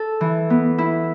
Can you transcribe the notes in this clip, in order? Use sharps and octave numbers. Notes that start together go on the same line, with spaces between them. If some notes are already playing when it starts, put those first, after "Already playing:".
Already playing: A4
E3
B3
E4